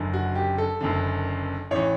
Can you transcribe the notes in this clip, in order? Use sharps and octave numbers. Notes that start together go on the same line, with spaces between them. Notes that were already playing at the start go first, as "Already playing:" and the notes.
Already playing: F#1 F#2 D3
F#4
G4
A4
F#1 F#2 D3
A1 E3 C#5